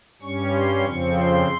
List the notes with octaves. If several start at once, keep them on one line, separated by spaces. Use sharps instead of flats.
G2 G3 C#4 C#6
C6
F2 C#3 F3 C4 C#6
C6